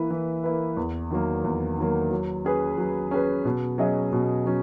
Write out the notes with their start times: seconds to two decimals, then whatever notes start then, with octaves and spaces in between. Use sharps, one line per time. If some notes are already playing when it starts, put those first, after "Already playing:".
Already playing: E3 A#3 E4 B4
0.10 E3
0.44 A#3 E4 B4
0.77 E2
1.11 D#3 F#3 A#3
1.44 E2
1.78 D#3 F#3 A#3
2.11 F#3
2.45 C#4 G#4 B4
2.78 F#3
3.11 C#4 G#4 B4
3.45 B2
3.78 F#3 C#4 G#4 D#5
4.13 B2
4.45 F#3 C#4